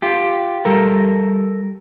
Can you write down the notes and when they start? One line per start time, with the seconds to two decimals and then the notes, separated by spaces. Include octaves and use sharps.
0.02 F4 G4
0.65 G3 A4 A#4